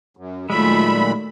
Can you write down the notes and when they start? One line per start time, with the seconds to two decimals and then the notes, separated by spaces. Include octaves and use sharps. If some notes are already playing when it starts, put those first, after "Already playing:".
0.17 F#2
0.50 A#2 D#3 F#3 G#3 A3 E5 B5